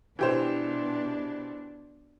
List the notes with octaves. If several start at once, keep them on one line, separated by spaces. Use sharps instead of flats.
B2 E3 D4 G4 C5